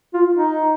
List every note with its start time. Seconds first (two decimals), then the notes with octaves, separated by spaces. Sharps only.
0.14 F4
0.36 D#4